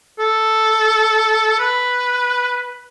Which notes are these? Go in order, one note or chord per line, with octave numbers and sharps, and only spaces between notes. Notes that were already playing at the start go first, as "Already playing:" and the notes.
A4
B4